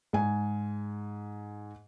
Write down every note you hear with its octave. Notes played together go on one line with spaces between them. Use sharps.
G#2 G#5